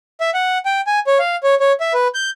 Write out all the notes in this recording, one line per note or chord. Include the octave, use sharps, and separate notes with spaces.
E5
F#5
G5
G#5
C#5
F5
C#5
C#5
E5
B4
G6